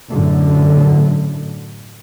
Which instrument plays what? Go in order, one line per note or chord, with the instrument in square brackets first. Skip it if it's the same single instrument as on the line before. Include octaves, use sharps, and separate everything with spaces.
[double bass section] F#2 A2 D3